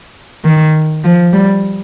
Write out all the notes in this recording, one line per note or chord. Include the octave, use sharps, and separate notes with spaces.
D#3
F3
G3